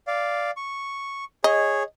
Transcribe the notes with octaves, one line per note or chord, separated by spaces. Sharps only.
D5 F5
C#6
G#4 C#5 D#5